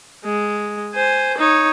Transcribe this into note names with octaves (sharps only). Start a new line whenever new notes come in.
G#3
C5 G#5
D#4 C#5